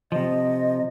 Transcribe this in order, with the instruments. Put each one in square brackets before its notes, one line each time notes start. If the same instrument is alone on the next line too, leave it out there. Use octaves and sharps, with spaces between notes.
[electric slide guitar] C3 F3 [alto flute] D#5